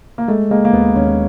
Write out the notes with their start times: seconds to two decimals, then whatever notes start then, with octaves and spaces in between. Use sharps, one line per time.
0.18 A#3
0.28 G#3 A3
0.51 G#3 A#3
0.65 A#3
0.73 D#2 B3
0.96 D#2 C#4